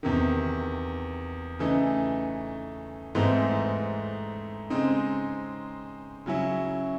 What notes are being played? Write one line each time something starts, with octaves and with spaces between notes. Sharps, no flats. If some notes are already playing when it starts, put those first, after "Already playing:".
E2 C3 D#3
C#3 E3 A3 D#4
G#2 E3 A3 C4 D#4
C#3 G#3 C4 D#4
C#3 F#3 C#4 E4